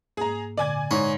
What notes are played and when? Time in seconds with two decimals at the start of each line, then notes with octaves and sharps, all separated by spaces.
0.17 G#2 A#3 G#4 A#5
0.57 A#2 D3 D5 G#5 D6 G#6
0.91 G#2 C#5